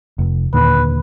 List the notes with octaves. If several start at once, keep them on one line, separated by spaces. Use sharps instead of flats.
F1
D#2 A#2 D3 B4